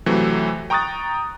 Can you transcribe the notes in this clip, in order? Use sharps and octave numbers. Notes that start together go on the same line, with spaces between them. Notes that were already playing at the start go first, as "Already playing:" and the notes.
C3 E3 F#3 A3
G5 A#5 C#6 D#6 F#6 A6